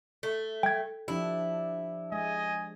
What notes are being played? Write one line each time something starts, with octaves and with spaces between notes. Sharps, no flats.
A3
G5 G#6
F3 D4 E4 G4
G#3 D#5 G#5